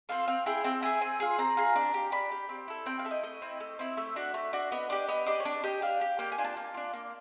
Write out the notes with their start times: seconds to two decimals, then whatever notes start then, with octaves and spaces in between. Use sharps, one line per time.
0.09 C4 F4 A4 F5
0.28 C4 F5
0.46 E4 G#4 G5
0.64 C4 G5
0.82 E4 G#4 G#5
1.01 C4 G#5
1.20 F4 G#4
1.39 C4 A#5
1.57 F4 G#4
1.75 D4
1.94 G4
2.12 D4 B5
2.31 G4
2.49 C4
2.68 E4 A4
2.86 C4 G5
2.99 F5
3.05 E4 A4
3.11 D#5
3.23 A3 D#5
3.42 C4 E4
3.60 A3
3.79 C4 E4
3.97 A3 E5
4.16 D4 F#4
4.34 A3
4.53 D4 F#4
4.72 B3 D#5
4.90 D4 G4
5.08 B3 D#5
5.26 D4 G4 D#5
5.40 C#5
5.45 D4 D5
5.64 G4 D#5
5.82 D4 F5
6.01 G4
6.19 A#3 G5
6.32 G#5
6.38 D4 F4
6.45 A5
6.57 A#3
6.74 D4 F4
6.93 A#3